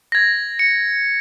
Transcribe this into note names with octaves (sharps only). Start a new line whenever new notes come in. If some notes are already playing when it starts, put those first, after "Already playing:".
G#6 A#6
C#7